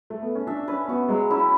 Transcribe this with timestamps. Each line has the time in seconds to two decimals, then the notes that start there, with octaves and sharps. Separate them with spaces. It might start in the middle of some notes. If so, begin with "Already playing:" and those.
0.10 A3
0.22 B3
0.35 C#4
0.47 D4 E5
0.68 C#4 B4
0.88 B3 F#4
1.09 F#3 G#3
1.31 C#4 E4